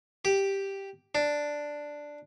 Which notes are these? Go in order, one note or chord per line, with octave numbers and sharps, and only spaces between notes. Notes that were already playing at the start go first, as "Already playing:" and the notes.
G4
D4